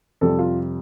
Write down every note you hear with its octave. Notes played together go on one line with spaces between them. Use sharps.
F2 C3 G3 A4
F4